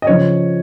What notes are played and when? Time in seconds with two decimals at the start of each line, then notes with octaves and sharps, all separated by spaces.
0.02 D#5
0.07 C#3 F3 C#5